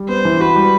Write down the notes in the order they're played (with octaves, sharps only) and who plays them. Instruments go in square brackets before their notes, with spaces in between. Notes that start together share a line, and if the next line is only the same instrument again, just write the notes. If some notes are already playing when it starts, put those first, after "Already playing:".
Already playing: [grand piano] G3
[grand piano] B3 [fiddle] C5
[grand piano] E3
[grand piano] F#4 [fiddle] B4
[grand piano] G3